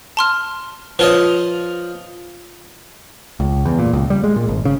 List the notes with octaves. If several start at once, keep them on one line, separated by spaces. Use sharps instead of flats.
A5 C6 F6
F3 F4 B4 C#5 D#5
C#2
E2
A#2
C#2
G3
G#3
A#2
G#1
C#3